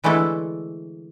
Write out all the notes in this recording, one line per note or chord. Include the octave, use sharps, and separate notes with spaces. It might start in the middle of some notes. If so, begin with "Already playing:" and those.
D3 E3 G#3 A3 E4 A4